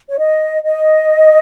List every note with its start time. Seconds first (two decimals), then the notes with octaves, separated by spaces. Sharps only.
0.09 C#5
0.19 D#5
0.64 D#5